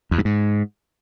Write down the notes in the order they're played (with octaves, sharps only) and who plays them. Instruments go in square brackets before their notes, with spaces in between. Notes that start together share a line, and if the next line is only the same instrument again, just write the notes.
[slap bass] E2
G2
G#2